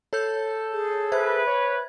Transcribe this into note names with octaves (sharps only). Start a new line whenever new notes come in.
A4 C#5 G6
G#4
B4 C5 E5 G#6
C#5